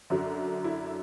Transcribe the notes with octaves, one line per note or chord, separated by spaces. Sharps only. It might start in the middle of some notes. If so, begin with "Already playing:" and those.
F#2 D3 F#3
E4